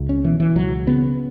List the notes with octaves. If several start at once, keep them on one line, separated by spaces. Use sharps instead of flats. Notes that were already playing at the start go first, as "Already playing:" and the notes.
Already playing: C#2
C#4
B2 E3
E3
C#2 F#3
C#3 B3